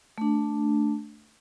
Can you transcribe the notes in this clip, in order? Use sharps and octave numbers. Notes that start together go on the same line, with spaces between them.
A3 D4